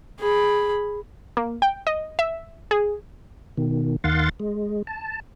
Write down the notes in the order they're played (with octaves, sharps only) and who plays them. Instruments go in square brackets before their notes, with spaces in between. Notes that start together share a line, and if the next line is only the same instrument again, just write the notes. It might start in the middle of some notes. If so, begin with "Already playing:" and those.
[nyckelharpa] G#4 B5
[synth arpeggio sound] A#3
G5
D#5
E5
G#4
[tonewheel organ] B2 D#3
D#2 D#3 F5 F#5 C6 A6
G#3
A5